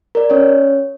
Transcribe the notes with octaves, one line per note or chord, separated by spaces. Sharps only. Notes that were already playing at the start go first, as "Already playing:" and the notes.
A#4 D5
C#4 C#5